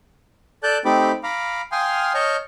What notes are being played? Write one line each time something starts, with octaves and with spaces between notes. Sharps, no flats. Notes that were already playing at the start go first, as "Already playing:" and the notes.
A4 D5 A5 F#6 G6
A3 C4 D#4 G4 B5 D6
F5 A#5 B5 D6
F5 G5 G#5 C6 D#6 F6
C#5 D#5 A5 C#6 F6 G6